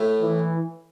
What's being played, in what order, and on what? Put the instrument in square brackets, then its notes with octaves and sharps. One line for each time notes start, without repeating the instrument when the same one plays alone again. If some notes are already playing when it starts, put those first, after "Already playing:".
Already playing: [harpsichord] A2 A3 E4
[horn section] E3